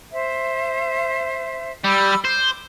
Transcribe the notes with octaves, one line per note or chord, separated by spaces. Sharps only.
C5 E5
G3 B5 D6 E6
C5 D6